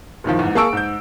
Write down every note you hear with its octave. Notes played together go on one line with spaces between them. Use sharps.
F#1 A2 D#3 F3
E2 G#2
A#3 G#4 A5 C#6 E6 D7
G#2 G6